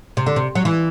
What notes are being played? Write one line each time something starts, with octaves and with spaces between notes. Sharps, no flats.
C3
D3
C3
F#3
E3